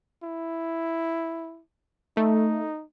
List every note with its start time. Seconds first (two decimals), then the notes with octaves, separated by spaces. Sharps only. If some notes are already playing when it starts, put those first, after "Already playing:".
0.23 E4
2.17 A3 D#4